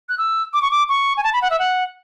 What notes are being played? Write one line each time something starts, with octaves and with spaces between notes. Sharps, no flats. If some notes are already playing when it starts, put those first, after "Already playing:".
F#6
E6
D6
C#6
D6
C#6
G#5
A5
B5
F#5
E5
F#5